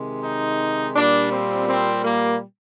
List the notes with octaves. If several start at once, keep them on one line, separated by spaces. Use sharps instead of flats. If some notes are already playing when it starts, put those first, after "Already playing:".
Already playing: C3 D#3 G#3
D#4
A#2 G3 D4
C4
C4
A#3